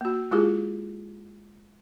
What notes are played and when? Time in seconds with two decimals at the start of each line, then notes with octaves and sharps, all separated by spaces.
0.01 A#3 F#4
0.31 G#3 E4 F4 G4 G#4